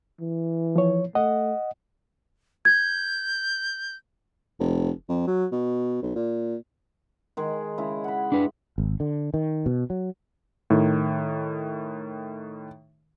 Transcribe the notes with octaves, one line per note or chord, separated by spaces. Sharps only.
E3
F3 C#5
A3 D#5 F#5
G6 G#6
F1
F2
F#3
B2
B1
A#2
D#3 G#3 G#4
C#3 G#3 E4
F#5 B5
D4 B4
G#1
D3
D#3
B2
F#3
A2 D#3